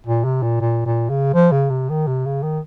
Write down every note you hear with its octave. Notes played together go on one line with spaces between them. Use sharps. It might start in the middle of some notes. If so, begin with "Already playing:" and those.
A#2
C3
A#2
A#2
A#2
C#3
F3
C#3
C3
D#3
C3
C#3
D#3